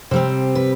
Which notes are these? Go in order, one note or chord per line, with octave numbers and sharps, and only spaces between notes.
C3 G3 C4 C5
B4